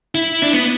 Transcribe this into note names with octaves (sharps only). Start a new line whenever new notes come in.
E4
D4
B3